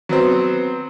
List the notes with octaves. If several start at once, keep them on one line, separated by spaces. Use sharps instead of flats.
F#3 B3 C4